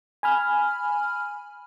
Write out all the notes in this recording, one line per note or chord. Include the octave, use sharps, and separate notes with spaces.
G#5 B5 F6